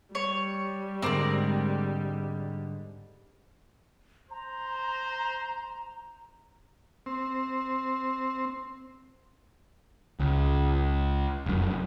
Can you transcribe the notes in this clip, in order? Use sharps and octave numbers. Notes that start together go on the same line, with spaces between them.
G3 C#5
G#2 D3 G#3 C4 A#4 D5
C5 A#5
C4
C#2
F1 F#2